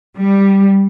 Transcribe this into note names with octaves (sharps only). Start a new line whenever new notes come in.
G3